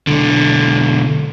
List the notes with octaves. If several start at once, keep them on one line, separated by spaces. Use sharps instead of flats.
B1 D3